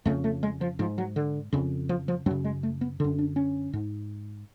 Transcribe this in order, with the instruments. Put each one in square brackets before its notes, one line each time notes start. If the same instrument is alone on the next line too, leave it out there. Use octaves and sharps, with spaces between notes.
[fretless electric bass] F2 C#3 A3
A3
G#3
F3
G#2 F3
F#3
D3
F2 C#3
F3
F3
F#2 F#3
C#3
G#3
A3
B3
F#2 D3
D4
C#4
G#2